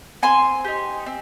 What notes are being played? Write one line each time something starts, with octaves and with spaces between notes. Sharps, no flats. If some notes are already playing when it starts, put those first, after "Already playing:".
C4 G#5 C6
D#4 G4
C4